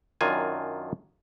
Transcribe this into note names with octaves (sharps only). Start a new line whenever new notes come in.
F#2 D#3 D4 F4 G#5